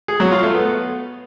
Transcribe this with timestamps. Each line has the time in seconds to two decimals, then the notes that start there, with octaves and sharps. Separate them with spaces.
0.08 G#4
0.20 F#3
0.31 F4
0.43 A3
0.54 B3